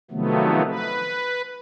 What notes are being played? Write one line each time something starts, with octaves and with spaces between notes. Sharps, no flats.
C3 D#3 F3 F#3 A3 B3
B4